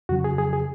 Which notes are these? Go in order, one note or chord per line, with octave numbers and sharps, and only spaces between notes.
F2 C#3 F#3 F#4
G#4
G#4
G#4